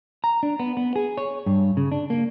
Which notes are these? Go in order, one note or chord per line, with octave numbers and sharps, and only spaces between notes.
A#5
D4
B3
B3
G#4
C#5
G2
C#3
D4
A#3